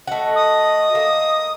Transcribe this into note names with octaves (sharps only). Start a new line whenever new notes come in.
A3 F#4 D#5
D#6
A#3